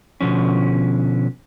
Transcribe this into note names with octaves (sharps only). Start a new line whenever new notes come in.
B2 D3 F3 C#4